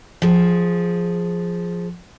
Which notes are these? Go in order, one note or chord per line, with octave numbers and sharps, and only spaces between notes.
F3 G#4